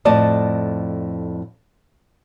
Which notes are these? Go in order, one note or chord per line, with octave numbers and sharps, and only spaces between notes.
F2 A2 D5 D#5 A5